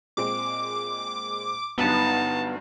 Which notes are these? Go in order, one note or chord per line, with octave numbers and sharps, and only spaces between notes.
A#2 G#3 C4 D6
G1 G2 F#3 B3 D#4 A5